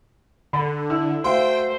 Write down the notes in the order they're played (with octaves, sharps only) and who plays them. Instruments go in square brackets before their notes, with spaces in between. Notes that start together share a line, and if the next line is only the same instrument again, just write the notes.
[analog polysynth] D3 [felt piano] B5
[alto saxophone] E4 [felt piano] E6
[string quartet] A3 C5 [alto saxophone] F#4 [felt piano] E5 F5 C6 [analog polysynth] G5